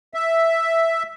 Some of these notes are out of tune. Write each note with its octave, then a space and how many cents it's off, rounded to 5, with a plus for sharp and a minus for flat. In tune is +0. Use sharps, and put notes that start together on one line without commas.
E5 +0